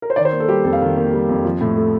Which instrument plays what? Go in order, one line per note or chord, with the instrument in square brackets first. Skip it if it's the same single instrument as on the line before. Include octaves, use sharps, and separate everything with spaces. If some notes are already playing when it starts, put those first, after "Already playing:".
[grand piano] A#4
C5
D#3 D5
C5
A#3
A4
G3 G4
F2 A4
F5
D#3
A#3
G3
F2
F3
A2
A3